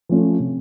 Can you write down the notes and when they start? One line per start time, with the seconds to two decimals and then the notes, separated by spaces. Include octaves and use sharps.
0.09 F3 A3 C#4 F4
0.40 C3